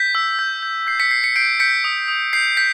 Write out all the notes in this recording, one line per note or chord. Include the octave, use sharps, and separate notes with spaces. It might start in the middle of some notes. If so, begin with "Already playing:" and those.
Already playing: G6 B6
E6
G6
G6
G6 C7
B6 C#7
G6 C7
B6 C#7
G6 C7 D7
G6 B6 C#7
D#6
D#6
G6 C7
G6 B6